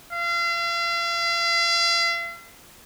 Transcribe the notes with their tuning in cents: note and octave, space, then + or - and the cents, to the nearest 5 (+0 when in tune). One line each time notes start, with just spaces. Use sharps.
F5 -40